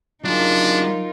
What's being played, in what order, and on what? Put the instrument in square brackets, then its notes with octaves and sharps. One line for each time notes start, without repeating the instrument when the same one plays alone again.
[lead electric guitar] F#3 G#4 [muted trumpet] D4 [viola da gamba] D#4 F4 A#4